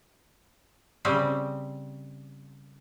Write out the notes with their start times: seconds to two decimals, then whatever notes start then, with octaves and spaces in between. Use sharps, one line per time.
1.05 C#3 G3 C4